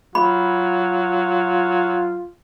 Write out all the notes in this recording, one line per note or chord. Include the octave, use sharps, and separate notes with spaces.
F#3 F4 B5